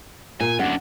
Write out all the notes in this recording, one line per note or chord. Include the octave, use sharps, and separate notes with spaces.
A#2 G#5
F#2 D3 F#5